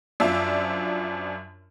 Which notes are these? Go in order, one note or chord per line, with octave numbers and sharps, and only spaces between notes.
F#2 F3 D4 F4 E5